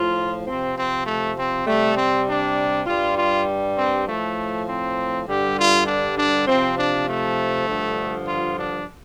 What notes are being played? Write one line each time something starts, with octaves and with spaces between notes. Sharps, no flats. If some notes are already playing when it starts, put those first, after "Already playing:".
Already playing: A2 F3 F4
C3 F3 C4
C4
A3
C4
C3 G3 A3
C4
D4
G2 G3 F4
F4
C4
A2 F3 A3
C4
G2 D3 G3 G4
F4
D4
D4
C3 F3 C4
D4
A3
G2 D3 F3
F4
D4